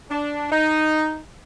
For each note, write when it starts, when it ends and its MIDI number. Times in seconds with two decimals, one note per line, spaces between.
0.10 0.51 62
0.52 1.19 63